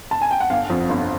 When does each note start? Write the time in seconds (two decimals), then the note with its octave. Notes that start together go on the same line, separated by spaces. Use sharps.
0.11 A5
0.22 G#5
0.31 G5
0.40 F#5
0.50 G1 F5
0.70 F2
0.89 G1